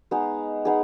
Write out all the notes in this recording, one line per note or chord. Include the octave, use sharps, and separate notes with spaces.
G#3 B3 D#4 G#4
G#3 B3 D#4 G#4